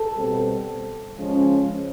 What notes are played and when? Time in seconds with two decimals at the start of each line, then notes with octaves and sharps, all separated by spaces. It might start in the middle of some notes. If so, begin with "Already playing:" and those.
Already playing: A4
0.15 B2 G3 C4
1.17 C#3 F3 G#3 C#4